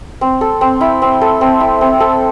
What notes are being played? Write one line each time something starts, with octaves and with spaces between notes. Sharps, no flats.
C4
A4
C4
E4
C4
A4
C4
E4
C4
A4